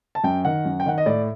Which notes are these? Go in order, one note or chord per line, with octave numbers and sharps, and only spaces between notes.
A5
F#2 G5
D#3 F#5
F#2
G5
D#3 F#5
D#5
A2 D5